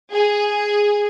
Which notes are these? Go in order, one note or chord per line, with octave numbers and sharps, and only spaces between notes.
G#4